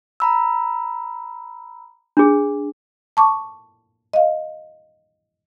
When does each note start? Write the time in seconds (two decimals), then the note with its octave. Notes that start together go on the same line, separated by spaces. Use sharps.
0.20 A#5 B5 E6
2.17 D4 G#4
3.17 A5 C#6 D6
4.13 D#5 F5